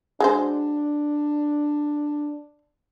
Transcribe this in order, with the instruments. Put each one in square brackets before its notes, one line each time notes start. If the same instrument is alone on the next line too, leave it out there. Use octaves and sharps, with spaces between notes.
[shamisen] G#3 F#4 C5 [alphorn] D4